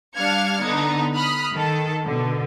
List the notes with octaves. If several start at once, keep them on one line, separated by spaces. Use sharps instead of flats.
G3 D4 F5 F6 G#6 C#7
D3 B3 D4 D#4
B5 D#6 F6 F#6
D#3 A4
B2 D3